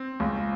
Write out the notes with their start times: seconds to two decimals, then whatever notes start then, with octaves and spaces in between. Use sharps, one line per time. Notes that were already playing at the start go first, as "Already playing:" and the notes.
Already playing: C4
0.20 C#2